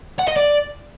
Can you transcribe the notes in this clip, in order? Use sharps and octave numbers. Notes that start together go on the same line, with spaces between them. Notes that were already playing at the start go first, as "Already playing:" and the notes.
F#5
D#5
D5